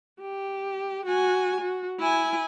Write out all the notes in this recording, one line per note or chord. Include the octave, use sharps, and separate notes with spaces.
G4
F#4 G#5
F#4
E4 G#5